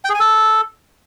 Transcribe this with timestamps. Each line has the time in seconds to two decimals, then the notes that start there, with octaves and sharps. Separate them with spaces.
0.05 G5
0.10 G#4
0.15 G#5
0.20 A4